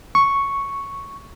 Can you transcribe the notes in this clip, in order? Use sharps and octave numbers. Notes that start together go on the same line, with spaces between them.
C#6